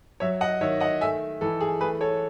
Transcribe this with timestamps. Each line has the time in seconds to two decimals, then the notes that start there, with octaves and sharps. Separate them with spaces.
0.20 F#3 C#5 E5
0.41 D#5 F#5
0.61 D#3 C#5 E5
0.80 D#5 F#5
1.01 A3 E5 G#5
1.41 E3 A4
1.61 G#4
1.81 A3 G#4 B4
2.01 A4 C#5